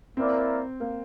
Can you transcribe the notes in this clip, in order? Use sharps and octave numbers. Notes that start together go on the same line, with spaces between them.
A#3 C4 E4 A#4 D5
A#3